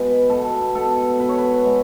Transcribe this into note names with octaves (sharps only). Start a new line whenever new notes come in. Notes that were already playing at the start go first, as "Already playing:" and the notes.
Already playing: B2 G#3 B3 B4
B2 A4
G#3 B3 A4
B2 B4
C#5
B4
G#3 B3